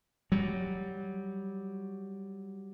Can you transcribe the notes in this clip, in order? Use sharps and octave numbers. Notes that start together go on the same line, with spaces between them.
F#3 G3